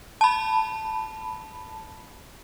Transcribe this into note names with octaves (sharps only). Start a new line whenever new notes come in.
A5 B5